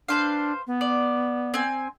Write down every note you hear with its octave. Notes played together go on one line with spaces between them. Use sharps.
D4 B4 C5 F5
B3
D5
C4 G#5